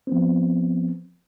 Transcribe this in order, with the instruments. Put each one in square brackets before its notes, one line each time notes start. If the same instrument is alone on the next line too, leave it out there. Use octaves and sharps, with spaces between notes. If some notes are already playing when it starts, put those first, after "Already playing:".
[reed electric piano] F3 B3 C4